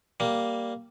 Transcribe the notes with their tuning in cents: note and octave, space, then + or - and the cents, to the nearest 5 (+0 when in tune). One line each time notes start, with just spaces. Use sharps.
G3 +0 A#3 +0